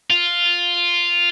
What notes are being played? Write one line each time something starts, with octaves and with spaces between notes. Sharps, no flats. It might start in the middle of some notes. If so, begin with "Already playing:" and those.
F4